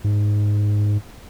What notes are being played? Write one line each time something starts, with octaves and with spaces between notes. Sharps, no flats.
G#2